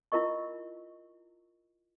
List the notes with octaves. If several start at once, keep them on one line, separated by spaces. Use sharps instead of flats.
E4 F4 A#4 D#5 C#6